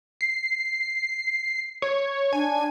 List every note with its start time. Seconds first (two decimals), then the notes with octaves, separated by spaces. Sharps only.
0.21 C7
1.82 C#5
2.33 D4 G#5